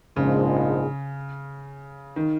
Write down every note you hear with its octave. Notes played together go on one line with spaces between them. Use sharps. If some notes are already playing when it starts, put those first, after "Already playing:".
A#1 G#2 C#3 F3 G#3
D#3